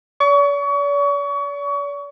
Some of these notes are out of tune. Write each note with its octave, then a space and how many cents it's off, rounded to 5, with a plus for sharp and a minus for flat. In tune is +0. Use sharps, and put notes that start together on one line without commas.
D5 -45 C#6 +30